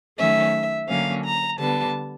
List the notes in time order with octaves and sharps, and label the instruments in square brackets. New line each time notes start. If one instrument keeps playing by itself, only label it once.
[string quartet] D#3 F#3 A3 C#4 E5
D3 F#3 A#3 C#4 F5
A#5
D3 G3 B3 A5